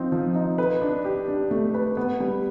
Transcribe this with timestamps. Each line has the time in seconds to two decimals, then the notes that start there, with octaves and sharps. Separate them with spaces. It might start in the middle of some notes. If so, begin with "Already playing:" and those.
Already playing: F3 C4 D#4
0.12 F3
0.35 D#4
0.58 B4
0.81 D4
1.05 G4
1.28 D4
1.51 A3
1.74 B4
1.97 B3
2.20 G3